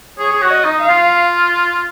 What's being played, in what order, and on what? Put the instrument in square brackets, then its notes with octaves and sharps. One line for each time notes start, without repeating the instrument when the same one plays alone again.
[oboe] G#4 [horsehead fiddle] C#5
[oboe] G#4
F#4
[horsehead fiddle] D#5
[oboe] D#4
[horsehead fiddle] F5
[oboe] F4